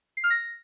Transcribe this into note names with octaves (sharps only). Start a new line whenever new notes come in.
C7
F6
A#6